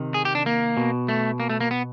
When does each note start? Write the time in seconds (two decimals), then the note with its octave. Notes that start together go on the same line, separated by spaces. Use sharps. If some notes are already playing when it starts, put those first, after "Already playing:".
Already playing: C3 D#3
0.14 G#4
0.25 G4
0.35 D4
0.46 A#3
0.77 B2
1.08 A3
1.40 A#3
1.50 A3
1.61 A#3
1.71 B3